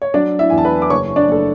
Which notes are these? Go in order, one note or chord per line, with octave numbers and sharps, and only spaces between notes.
C#5
F#3 D4 D5
E4 E5
E2 G#5
A5
B4 B5
D6
F#1 C#5 C#6
D4 D5
F#1 A4